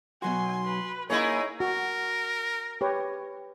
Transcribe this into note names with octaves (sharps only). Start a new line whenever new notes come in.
B2 F#3 F#4 G#5 C6
B4
A#3 D#4 E4 G#4 C#5 G#5
F#4 A#4
G4 B4 C#5